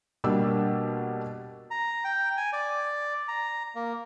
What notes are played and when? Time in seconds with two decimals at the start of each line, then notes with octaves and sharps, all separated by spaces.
0.24 B2 G3 A#3 D4 G4 E6
1.71 A#5
2.04 G5
2.37 G#5
2.53 D5
3.28 A#5
3.75 A#3